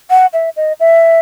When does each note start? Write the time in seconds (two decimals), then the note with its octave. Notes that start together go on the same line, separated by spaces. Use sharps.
0.10 F#5
0.33 E5
0.56 D#5
0.80 E5